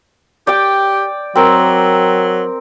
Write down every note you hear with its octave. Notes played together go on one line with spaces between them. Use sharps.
G4 D5 G5
F#3 C4 A#4